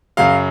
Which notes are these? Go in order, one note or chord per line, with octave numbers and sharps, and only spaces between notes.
F#2 C#3 F#3 F5